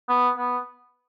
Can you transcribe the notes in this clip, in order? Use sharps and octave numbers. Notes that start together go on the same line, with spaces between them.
B3
B3